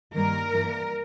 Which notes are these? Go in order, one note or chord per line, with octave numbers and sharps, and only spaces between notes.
G2 D#3 G3 A#3 A#4
G2 E3 G3 A#3